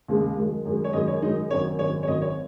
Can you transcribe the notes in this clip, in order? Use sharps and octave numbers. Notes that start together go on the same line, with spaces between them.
D#2 C#3 G#3
F#2 D#3 G#3
F#2 D#3 G#3
C#5
F#2 D#3 G#3 D#5
C#5
F#2 D#3 G#3 D#4
G#1 F#2 D#3 C#5
G#1 F#2 D#3 C#5
C#5
G#1 F#2 D#3 D#5
C#5